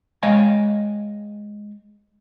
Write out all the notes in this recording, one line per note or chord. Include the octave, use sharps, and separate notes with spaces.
G#3 C#5 D#5 F5 G5 G#5